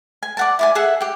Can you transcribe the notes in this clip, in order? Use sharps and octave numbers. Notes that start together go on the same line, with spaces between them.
G#5
D5 F#5 A5
E4 D5 G#5
G#4 A4 E5 F#5
G4 G5